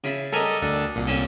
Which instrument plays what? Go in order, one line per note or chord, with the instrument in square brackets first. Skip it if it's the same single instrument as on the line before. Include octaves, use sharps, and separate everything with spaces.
[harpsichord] C#3 E4 A5
[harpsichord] G3 A#4 G#5 [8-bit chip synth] A4 D#5
[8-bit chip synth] D2 D4 A4
C2 A#2
[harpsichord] C4 C#4 A4